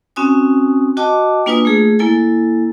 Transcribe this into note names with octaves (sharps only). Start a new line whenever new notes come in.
C4 C#4 F#4 G#5 D#6
F#4 D#5 G5 A5 D6
A#3 D4 F4 B4 G#5 D#6
A3 G#4
A#3 E4 A4 G#5